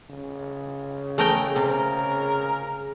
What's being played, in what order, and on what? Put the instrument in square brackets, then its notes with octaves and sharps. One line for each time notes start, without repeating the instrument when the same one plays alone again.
[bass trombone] C#3
[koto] A3 A#4 G5 [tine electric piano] G#4
[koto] C3 [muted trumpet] A#4